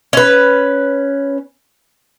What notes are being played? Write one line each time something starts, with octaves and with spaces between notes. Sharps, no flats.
C#4 B4